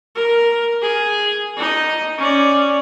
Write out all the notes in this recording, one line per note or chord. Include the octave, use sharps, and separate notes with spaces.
A#4
G#4
D#4 D#5
C#4 D5